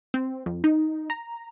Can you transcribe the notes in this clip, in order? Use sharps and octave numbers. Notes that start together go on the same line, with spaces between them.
C4
F2
D#4
A#5